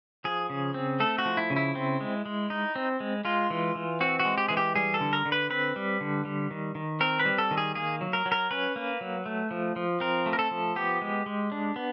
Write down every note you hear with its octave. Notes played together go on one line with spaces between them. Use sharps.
F3 G#4
C#3
C4
A3 A4
F#4
F3
E4
C#3
E4
C4
G#3
G#3
D#4
C4
G#3
G#3 F4
E3
E3
C4 F#4
F#4
G#3
G4
E3 G#4
G4
G3 G#4
A4
D3
A#4
D3
B4
C4 B4
G3
D3
G3
D#3
D#3
C4 A#4
B4
G3
A4
D#3
G#4
A#3 G#4
F#3
A#4
F#3
A#4
C#4 B4
A#3
F#3
A3
F3
F3
C4 A#4
A3
A#4
A4
F3
B3 G4
G#3
G#3
D4
B3